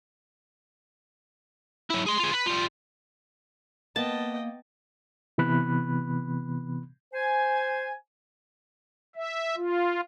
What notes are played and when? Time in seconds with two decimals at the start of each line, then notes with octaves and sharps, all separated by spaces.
1.90 F#3 E4
2.06 G#4 C6
2.20 F4 G#4
2.33 B4
2.46 G3 F4
3.96 A#3 B3 D#5 G5 A5
5.38 C3 E3 B3 B5 F#6
7.14 C5 G#5
9.16 E5
9.56 F4